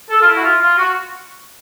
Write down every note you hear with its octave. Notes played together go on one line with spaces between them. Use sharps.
A4
F4
E4
F#4
F4
F4
F#4